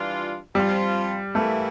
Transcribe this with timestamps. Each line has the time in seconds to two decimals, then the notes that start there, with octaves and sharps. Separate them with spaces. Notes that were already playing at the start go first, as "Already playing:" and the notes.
Already playing: E3 G3 D4 F4
0.55 F3 G3 C4 F4
1.35 E3 A3 A#3 E4